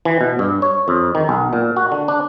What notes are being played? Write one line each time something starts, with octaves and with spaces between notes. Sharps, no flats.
E3
B2
G2
C#5
F2
D#3
B1
A#2
F#4
D3
D4